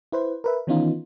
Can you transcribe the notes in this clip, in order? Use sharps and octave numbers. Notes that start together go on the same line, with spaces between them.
E4 B4 C5
A#4 B4 E5
D#3 E3 B3 C#4 D#4 F4